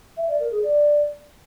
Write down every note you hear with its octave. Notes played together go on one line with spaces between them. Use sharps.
E5
D5
A#4
G#4
D5